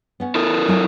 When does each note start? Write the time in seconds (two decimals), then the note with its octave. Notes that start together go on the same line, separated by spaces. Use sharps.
0.20 B3 C#4 F#5
0.35 E4 A4 A#4
0.68 F#3 C4 G#5